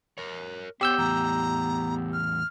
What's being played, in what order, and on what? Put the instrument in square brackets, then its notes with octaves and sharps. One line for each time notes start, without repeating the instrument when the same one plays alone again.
[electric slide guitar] A#4 C#5
[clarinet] B3 [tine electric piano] G4 E6 G6 [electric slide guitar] C5 C#5
[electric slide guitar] E2 A2 [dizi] A#5
[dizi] F6